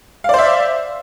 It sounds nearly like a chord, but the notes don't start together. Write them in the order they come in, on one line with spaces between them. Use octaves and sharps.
F5 D5 C5 E5